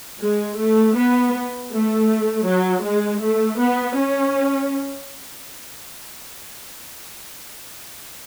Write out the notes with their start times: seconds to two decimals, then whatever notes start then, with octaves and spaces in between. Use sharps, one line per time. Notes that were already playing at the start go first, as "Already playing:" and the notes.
0.20 G#3
0.58 A3
0.96 B3
1.71 A3
2.47 F#3
2.84 G#3
3.22 A3
3.59 B3
3.98 C#4